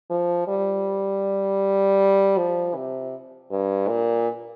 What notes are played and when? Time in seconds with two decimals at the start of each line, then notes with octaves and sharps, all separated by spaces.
0.10 F3
0.48 G3
2.38 F3
2.75 C3
3.51 G2
3.89 A#2